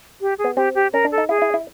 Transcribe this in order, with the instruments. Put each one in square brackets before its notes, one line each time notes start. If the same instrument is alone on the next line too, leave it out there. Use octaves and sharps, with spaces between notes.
[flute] G4
G#4
[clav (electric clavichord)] B3
[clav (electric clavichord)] C4 [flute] G4
[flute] G4
[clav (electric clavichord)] C#4 [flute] A#4
[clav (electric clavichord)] D4
[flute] A4
[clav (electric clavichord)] D#4
[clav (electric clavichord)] E4 [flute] G#4
[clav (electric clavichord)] E4
E4